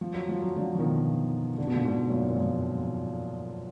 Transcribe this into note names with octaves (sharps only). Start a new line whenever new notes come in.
F3
F#3
F3
F#3
D3 F3
F3
B2 D#3
D3
B2
A#2 D3
G#2 B2
F#2 A#2
A#2
F2 G#2